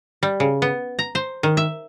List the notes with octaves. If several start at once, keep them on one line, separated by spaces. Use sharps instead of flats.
G3
C#3
B3
A#5
C5
D#3
E5